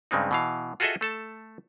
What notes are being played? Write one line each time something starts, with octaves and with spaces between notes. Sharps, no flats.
G2 C#3 G#3 C4 D#4
B2 E3 F5
F4 F#4 G#4 A4 D#5 E5
A3 A4 A5